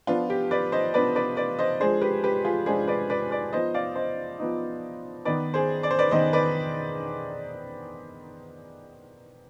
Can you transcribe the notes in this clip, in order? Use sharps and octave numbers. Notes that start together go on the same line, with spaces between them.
F3 B3 D4 F4
G4
B4 D5
C5 D#5
F3 B3 D4 B4 D5
B4 D5
B4 D5
C5 D#5
F3 G#3 D4 G#4 C5
G4 B4
G4 B4
F4 G#4
F3 G#3 D4 G#4 C5
B4 D5
B4 D5
B4 D5
F3 B3 D#4 C5 D#5
D5 F5
C5 D#5
F3 B3 D#4
D#3 B3 D#4 B4 D5
G#4 C5
D5
C5
B4 D5
D#3 B3 D#4 C5 D#5
B4 D5